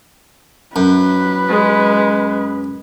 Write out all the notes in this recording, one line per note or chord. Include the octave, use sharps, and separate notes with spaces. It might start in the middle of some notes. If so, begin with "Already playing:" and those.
F#2 B4
G#3